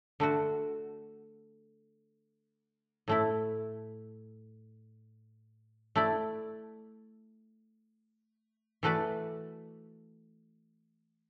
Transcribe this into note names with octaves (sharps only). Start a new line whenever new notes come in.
D3 A3 F#4
A2 A3 E4
A3 E4 D5
E3 A3 F#4 B4 D5